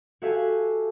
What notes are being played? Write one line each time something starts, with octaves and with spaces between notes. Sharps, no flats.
F#4 G4 A4 E5 F5 G#5